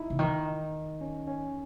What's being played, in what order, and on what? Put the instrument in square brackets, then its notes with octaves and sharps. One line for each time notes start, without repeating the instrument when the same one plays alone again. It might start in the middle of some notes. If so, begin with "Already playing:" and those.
Already playing: [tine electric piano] D#4 E4
[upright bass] C#3
[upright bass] D#3 [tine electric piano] D#4
[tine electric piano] C#4
C#4